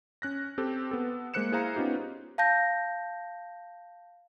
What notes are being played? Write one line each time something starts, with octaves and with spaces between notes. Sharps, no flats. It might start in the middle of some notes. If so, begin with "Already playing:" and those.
C#4 F#6 A#6
C4 G4 A4
B3 A4
G#3 A#3 C5 F#6 C#7 E7
E4 G#4 C5 F5 A#5
B3 C#4 D#4 F4 G4
F5 A5 G6 A#6